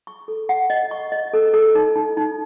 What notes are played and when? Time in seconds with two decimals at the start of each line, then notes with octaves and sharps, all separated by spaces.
0.07 C#6
0.28 A4
0.49 F#5
0.70 D#5
0.91 C#6
1.12 D#5
1.34 A4
1.54 A4
1.75 D#4
1.96 D#4
2.17 D#4